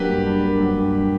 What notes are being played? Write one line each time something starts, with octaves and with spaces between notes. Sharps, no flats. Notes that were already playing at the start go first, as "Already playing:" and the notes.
Already playing: F#3 A#3 D4 G4 B4
G2
D4
A#3
F#3
G2
D4